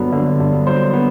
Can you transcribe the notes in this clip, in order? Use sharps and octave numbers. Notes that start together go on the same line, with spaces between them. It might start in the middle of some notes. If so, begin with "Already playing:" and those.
Already playing: G2 D3 F#3 B3
D3
G2
F#3 C5
B3